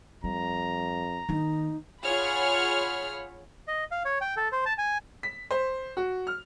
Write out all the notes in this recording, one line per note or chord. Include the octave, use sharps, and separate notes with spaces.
F2 G3 A#5
D#3 A#3 D#4
F4 G#4 C#5 F#5 B5 F6
D#5
F5
C#5
G5
A4
C5
A5
G#5
B6
C5
F#4
F6